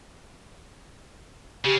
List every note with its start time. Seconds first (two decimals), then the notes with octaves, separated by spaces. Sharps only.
1.65 C#3 G4